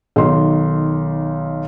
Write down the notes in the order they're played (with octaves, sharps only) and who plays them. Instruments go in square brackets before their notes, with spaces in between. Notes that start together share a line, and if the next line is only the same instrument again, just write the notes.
[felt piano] B1 D#3 C6